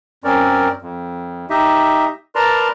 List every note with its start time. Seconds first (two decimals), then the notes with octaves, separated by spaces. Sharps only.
0.24 F#2 C4 C#4 A#4 D5
0.82 F2
1.50 D#4 G4 D#5 E5
2.35 A#4 B4 D5 A5 A#5 C6